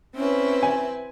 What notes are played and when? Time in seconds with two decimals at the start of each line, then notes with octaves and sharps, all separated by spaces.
0.15 C4 C#4 E4 B4
0.63 G#5